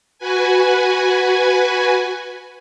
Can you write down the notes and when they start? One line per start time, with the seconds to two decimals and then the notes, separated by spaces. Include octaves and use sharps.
0.19 F#4 B4 G#5